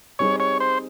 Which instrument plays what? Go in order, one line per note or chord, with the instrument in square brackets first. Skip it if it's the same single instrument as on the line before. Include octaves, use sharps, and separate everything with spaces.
[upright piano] G3 C4 D#4 G#4 [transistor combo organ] C#5
[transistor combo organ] C#5
C5